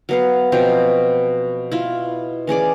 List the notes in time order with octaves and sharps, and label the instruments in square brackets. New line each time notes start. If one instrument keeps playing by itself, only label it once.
[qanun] F#3 B3 F5
B2 F3 F#3 C4
E4 F4
E3 C#4 G#4 D5